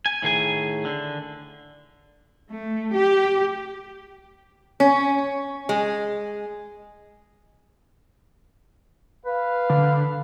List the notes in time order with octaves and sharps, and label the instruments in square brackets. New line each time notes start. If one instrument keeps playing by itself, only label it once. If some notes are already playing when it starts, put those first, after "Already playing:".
[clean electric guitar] G#5
A2 D#3 G#4 G#5
D3
[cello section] A3
G4
[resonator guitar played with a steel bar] C#4
G#3
[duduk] B4 [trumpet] F5
[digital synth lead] D3